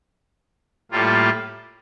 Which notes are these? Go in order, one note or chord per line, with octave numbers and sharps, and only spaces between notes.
A2 G3 A#3 F4 A4